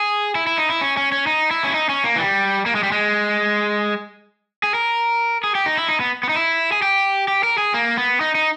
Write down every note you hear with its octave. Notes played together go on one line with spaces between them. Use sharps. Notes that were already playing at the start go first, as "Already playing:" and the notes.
Already playing: G#4
E4
E4
D#4
E4
C#4
C#4
C#4
D#4
E4
C#4
D#4
C#4
A#3
E3
G3
A#3
G#3
G3
G#3
G#4
A#4
G#4
G4
D#4
E4
D#4
B3
B3
D#4
E4
G#4
G4
G4
A#4
G#4
A#3
B3
D#4
D#4